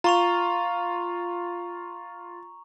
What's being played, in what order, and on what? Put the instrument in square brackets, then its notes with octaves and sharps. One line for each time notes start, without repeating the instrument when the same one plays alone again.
[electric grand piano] F4 [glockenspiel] A#5 C#6 F7